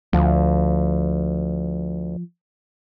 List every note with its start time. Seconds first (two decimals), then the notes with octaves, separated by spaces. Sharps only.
0.13 D2 F3